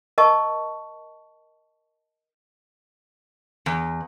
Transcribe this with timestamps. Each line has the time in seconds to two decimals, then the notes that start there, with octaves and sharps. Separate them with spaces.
0.18 A#4 D#5 A5 C#6
3.66 E2